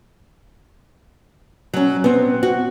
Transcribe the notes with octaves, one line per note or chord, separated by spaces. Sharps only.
F#3 C#4
B3 C4
F#4